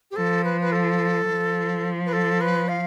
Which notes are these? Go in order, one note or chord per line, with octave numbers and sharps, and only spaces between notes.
G4
F3 A4
B4
B4
A4
F3
B4
A4
B4
F5